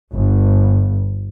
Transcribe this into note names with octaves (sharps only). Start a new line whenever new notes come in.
G1